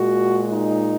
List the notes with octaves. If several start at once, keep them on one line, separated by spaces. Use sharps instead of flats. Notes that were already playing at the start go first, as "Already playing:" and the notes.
Already playing: A#2 G#3 F#4
D#4